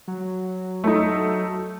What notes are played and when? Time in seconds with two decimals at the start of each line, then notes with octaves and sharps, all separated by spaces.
0.08 F#3
0.84 A3 D#4